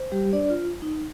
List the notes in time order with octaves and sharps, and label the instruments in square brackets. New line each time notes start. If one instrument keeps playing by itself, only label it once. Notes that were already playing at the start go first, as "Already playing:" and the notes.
Already playing: [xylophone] C5
[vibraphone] G3 G4
D4 D5
F4
D#4